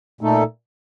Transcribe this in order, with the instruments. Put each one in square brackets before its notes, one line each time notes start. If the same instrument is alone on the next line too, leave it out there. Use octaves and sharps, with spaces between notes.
[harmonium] A#2 A3 D#4 A4